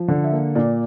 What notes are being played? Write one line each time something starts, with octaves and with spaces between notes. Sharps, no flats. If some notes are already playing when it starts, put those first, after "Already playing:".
Already playing: F3
D3
E5
A#3
A#2 D5